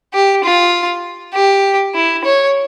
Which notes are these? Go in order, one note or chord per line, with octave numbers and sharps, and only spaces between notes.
G4
F4
G4
E4
C#5